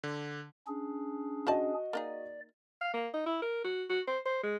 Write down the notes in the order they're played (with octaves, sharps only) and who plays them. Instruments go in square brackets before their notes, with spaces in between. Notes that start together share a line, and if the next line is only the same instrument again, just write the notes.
[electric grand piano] D3
[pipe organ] C#4 D4 G#4
[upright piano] F#4 D#5 [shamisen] C5 D5 A5
[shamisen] A#3 D#4 G#4 [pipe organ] D5
[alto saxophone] F5
A#3
D#4
E4
A#4
F#4
F#4
C5
C5
G#3